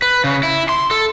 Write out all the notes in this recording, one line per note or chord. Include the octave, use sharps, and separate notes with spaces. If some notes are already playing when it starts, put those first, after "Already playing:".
B4
C#3
E4
C6
A4